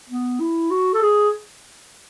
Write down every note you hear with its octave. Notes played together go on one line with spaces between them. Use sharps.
B3
E4
F#4
A4
G#4